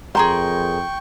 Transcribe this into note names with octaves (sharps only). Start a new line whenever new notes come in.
F2 G#4 A#4 G5 A#5 C6 C#6